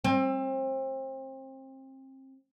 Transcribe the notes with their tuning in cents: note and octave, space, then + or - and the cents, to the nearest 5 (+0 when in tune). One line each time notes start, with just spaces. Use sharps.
C4 +30